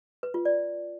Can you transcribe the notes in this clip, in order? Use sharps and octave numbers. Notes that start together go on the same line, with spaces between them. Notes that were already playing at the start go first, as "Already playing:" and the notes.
B4
F4
D5